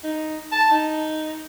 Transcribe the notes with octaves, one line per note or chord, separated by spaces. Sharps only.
D#4
A5
D#4